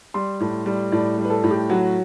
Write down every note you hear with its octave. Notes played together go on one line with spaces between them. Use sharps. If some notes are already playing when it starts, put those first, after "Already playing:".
G3 C6
A2
G3
A2 D5
G3
B4
A4
A2
G4
F#3 F#4